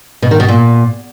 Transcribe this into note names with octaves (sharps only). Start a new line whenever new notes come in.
B2
D#3
B2
A#2